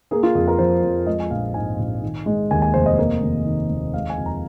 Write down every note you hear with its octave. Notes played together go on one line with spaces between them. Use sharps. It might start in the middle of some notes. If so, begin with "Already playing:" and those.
A#3 G#4
F4
F2 G#4
A#4
F3 C5
F2
G#3 D#5
G#5
A#1 F5
G#2 G#5
A#1
D#3
G#3
D#2 G#5
G#5
F1 C5
D#5
A#3
D#2
D#3
D#2
G#3 F5
G#5
F2
A#5